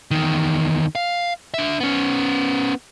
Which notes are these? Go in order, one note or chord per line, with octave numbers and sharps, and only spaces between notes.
E2 D#3
F5
D4 E5
B3 C#4